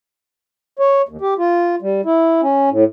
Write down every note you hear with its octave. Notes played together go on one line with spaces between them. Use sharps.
C#5
D#2
G4
F4
G3
E4
C#4
A2